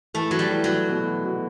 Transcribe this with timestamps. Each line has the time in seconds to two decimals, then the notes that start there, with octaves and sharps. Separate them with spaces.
0.14 E3 A3
0.31 F#3
0.39 G3
0.51 E3
0.64 F#3
0.89 B2
1.25 B2